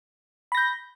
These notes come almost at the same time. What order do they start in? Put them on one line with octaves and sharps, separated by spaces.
B5 A#6 G6